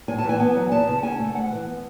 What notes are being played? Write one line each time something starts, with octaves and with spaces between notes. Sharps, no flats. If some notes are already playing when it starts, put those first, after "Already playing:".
A2 G#5
A5
E3
G#5
B3 G#5
F#3
E2 A5
C#3
C#4 G#5
A3
G#2 F#5
E3
B3